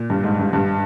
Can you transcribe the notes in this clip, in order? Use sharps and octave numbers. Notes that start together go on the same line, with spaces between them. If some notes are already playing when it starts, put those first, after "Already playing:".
Already playing: A#2
G2
G#2
G2
G2